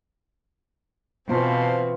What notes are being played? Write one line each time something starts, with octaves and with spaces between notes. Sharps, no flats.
B2 E3 C4 F4 C5 F5 A5